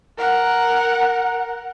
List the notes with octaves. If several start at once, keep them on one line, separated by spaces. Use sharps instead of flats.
A#4 F#5